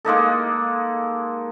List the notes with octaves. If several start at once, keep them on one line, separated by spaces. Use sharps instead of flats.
G#3 A#3 D#4 A4